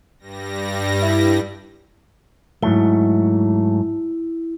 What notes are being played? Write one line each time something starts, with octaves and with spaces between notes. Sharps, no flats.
G2 G3 A#6
E4
G#2 F#3 A3 E4